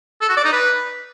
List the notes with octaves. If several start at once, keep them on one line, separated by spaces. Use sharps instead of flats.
A4
F#4
D5
D#4
B4